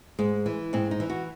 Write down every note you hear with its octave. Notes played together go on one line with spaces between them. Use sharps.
G#2 G#3
E3
G#2 C4
D#4
E3
F#4